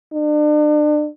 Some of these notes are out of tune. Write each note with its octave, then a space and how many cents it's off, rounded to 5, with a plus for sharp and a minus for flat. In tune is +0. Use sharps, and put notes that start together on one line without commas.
D4 +35